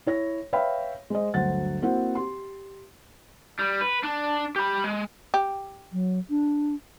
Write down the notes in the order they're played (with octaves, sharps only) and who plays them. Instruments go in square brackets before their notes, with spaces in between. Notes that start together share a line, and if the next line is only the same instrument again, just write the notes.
[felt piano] E4 C#5 A#6
B4 C#5 E5 F5 G5 B5
G#3 C5 D#5
G1 D2 F#3 C5 F#5 A6
A#3 C4 E4 F#4 C5 F#5
G4 C6
[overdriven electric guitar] G3
B4
D4
G4 B5
G#3
[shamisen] G4
[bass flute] F#3
D4